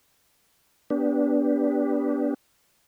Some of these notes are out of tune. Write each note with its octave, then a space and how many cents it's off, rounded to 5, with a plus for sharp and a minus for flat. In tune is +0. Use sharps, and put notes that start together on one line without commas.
B3 -10 D4 -20 G4 +0